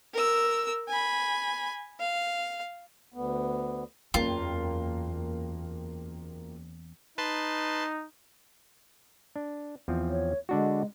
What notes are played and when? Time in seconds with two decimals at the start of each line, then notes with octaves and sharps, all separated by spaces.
0.13 A#4 E6
0.88 G#5 B5
2.00 F5
3.14 D2 B3
4.14 F#1 E2 A#3 F4 G5
7.18 D#4 B4 A5 C6
9.36 D4
9.88 E2 F3 C4
10.09 C#5
10.49 D3 G#3 D4 F#4